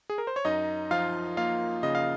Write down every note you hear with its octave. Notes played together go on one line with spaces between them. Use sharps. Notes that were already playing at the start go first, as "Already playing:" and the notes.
G#4
A#4
C5
C#5
F#2 D#4 D#5
F3 F4 F5
A#3 F4 F5
C#3 D#5
F5